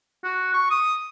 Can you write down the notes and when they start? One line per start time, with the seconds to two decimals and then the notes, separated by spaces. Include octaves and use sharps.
0.24 F#4
0.54 C#6
0.71 D#6